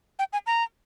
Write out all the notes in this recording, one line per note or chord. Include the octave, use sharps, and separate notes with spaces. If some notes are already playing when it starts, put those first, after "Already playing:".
G5
G#5
A#5